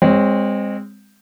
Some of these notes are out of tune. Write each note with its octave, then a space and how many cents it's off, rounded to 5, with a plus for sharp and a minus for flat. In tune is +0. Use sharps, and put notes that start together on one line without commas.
G#3 -30 C4 +0 C#5 +0